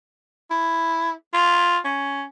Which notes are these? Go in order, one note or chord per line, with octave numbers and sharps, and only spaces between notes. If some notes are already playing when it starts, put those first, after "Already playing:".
E4
F4
C#4